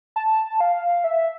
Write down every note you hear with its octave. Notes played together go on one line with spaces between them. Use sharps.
A5
F5
E5